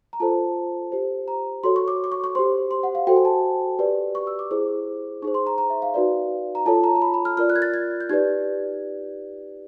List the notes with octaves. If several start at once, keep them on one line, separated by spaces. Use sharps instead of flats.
A#5
F4 A4 C5 A5
G4 C5
A#5
F#4 A4 C#5 C6
C#6
D6
D6
C#6
C#6
G4 C5 C6
C6
F#5
F5
F#4 A4 C5 G5
G#5
A5
G4 B4 D5
C#6
E6
D6
E4 G#4 C5
D#4 G#4 C5 C#6
C6
A#5
A#5
E5
F5
D#4 F#4 B4 D5
A#5
F4 A4 C#5 A5
A#5
A#5
B5
B5
F6
F4 A#4 D5 F6
F#6
G#6
A6
G#6
G6
D#4 G4 B4 D5 G#6